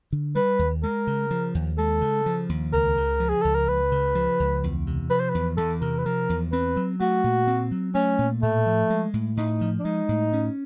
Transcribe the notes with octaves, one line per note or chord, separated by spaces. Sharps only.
D3
G3 B4
D#2
G#3 A#4
C#3
F3
D#2
G#3 A4
C#3
F3
D#2
C#2 A#4
C#3
F3
G#4
C#2 A4
A#4
C#2 B4
C#3
F3
C#2
E2
C3
F3 B4
C5
B4
E2
E2 A4
C3 A#4
B4
F3 A#4
E2
C4 B4
F#3
A3 F#4
A#2
C4
F#3
A3 C#4
A#2
A2 A3
F3
G#3
A2
A2 D#4
F3
D4
G#3 D#4
A2
C#4